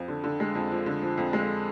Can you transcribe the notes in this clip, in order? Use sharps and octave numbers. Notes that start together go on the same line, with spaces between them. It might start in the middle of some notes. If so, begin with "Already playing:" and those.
Already playing: F2 F3
D3
D3
G#3
F2
F3
D3
F3
F2
G#3